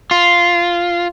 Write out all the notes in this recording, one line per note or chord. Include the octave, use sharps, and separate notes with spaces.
F4